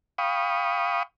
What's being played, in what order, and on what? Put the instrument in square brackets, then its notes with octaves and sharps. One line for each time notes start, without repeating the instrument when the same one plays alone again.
[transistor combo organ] F5 G5 B5 C#6 D#6